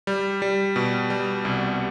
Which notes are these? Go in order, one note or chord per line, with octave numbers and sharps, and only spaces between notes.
G3
G3
B2
G3
C2